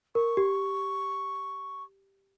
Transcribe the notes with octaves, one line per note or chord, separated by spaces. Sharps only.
A#4 C#6
G4